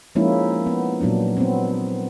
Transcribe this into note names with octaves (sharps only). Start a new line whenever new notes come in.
F3 G#3 A#3 C#4 D#4 E4
B3
A#2 F#3 B3 D4
B3 C4